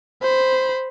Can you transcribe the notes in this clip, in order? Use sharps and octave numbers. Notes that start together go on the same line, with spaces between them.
C5 B5